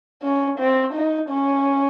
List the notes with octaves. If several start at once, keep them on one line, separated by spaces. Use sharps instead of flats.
C#4
C4
D#4
C#4